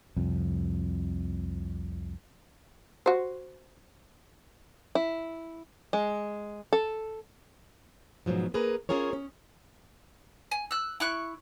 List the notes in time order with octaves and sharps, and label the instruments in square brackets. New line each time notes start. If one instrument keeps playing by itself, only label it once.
[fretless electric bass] C2 F2
[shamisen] F#4 C5
[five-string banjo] E4
G#3
A4
[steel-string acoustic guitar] G#2 B2 F3 F#3
A#3 G#4 A#4 B4
C#4 F4 G#4 A#4 C#5
C#4
[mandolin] G#5
E6 F#6
E4 C#6 F#6